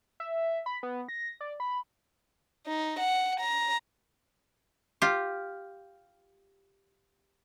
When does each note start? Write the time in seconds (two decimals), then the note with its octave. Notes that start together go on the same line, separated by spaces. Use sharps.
0.20 E5
0.66 B5
0.83 B3
1.09 A#6
1.41 D5
1.60 B5
2.66 D#4
2.99 F#5
3.40 A#5
5.02 F4 G4